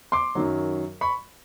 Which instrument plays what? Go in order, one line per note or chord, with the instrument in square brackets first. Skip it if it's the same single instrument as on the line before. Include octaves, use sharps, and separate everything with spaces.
[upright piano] C6 D6
F#2 D#3 F#3
B5 C#6